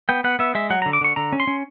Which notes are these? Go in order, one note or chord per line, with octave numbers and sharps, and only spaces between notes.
B3 G5
B3 F#5
B3 E5
G#3 E5
F#3 F#5
A#5
D3
D6
D3 C#6
D3 A#5
C#4
C6
C#4